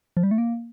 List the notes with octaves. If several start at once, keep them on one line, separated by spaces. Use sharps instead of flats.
F3
G3
A3
A#3